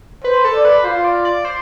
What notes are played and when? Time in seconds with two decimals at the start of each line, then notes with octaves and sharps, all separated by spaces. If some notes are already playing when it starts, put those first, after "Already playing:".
0.24 B4 C5
0.45 A4
0.54 D5
0.65 B4
0.84 F4 C5
1.04 D5
1.25 D5
1.45 C5